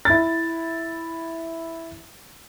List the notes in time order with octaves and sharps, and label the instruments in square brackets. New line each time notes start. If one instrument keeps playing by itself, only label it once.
[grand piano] E4 A6